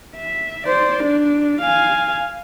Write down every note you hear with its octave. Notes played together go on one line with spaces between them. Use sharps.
E5
C5 D5
D4
F5 G#5